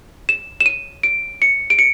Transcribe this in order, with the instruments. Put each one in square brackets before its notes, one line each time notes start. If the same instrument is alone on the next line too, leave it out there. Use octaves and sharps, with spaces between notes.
[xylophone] E7
E7
D#7
D7
C#7
D7
C#7